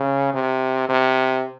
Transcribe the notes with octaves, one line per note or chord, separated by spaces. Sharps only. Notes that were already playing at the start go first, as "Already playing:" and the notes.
Already playing: C#3
C3
C3